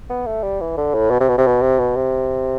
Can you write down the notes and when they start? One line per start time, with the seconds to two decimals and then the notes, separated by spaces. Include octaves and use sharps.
0.10 B3
0.26 A3
0.43 G3
0.61 E3
0.77 D3
0.94 A2
1.11 B2
1.20 C3
1.29 B2
1.38 C3
1.46 B2
1.61 C3
1.79 B2
1.96 C3